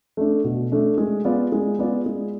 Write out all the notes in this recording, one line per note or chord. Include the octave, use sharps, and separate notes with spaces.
A3 D4
B2
A3 D4
G#3
B3 F4 G#4 D5
G#3
B3 F4 G#4 D5
G#3